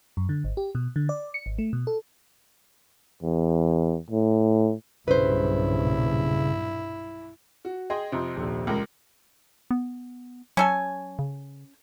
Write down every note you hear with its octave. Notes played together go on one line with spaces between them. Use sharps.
F#2
D3
G#1
G4
B2
D3
D5
C#7
G#1
A3
B2
A4
E2
A2
B1 G2 A#2 C#3 E4 B4 C5
F#4
G#4 D#5 G5 C6
F2 C3
D#1 A#1
C#2 G#3 A#4
B3
F#3 C#4 A4 G#5
C#3